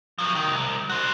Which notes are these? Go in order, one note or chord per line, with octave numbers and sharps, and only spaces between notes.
F3 F#3
D#3
C2
F#4 C5